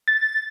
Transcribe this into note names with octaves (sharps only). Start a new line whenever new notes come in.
A6